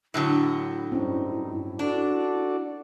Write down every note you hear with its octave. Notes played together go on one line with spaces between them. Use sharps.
A2 D3 F#3 E4
G2 G3 C4 C#4 D#4
D4 F#4 A4 D5